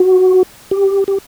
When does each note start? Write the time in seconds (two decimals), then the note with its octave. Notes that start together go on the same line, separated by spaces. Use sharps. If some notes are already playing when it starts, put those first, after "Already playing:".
Already playing: F#4
0.71 G4
1.08 G4